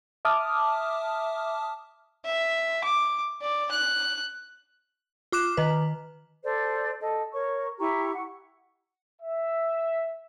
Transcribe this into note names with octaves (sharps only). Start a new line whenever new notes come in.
E5 A5 D6 D#6 F6
E5
D6
D5
F#6
F4 D6 F#6 E7
D#3 B4
A4 C5 D5
A4 D#5
A#4 C#5 C#6
E4 G4 A#5 C#6
F#5
E5